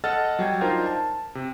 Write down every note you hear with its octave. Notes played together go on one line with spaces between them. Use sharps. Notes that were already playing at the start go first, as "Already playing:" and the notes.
A4 D#5 F#5 F6 A6
F#3 G3 G5 G#6
D4 D#4 F4 A#4 C5 G5
A5
C3